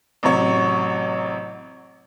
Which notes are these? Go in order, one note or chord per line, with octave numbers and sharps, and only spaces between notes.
A1 C3 F#3 C#5